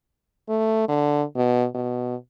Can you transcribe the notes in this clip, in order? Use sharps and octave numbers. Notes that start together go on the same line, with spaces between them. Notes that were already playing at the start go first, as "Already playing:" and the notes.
A3
D3
B2
B2